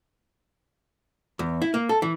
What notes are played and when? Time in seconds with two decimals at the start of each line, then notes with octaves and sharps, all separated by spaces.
1.39 E2
1.62 E4
1.74 A#3
1.89 A4
2.02 E3